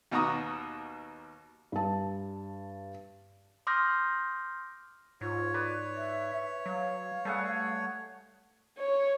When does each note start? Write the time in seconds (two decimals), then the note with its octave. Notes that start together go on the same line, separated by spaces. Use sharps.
0.12 D#2 B2 F#5 A#5 C#6 D#6
1.72 G2 A5
3.67 C6 D6 D#6 F6 G6 A#6
5.21 G#2 F4 C#5
5.54 B4 D5
5.96 E5
6.66 F#3 F5
7.25 G3 A3 G#4 F#5
8.78 C#5